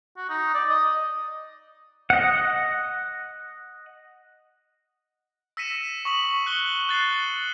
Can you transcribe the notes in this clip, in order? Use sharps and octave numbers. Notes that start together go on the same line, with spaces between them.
F#4
D#4
D5
D#5
D#5 F#5
E6 A#6 B6 C#7 D#7 E7
C#6 D#6 B6 F#7
F#6 C#7 G7
F#6 A6 C7